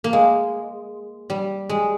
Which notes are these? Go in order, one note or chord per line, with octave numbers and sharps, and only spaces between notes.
A#3
G#3
G3
G#3